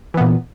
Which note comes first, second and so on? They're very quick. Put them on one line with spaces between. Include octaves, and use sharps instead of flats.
E3 B3 A#2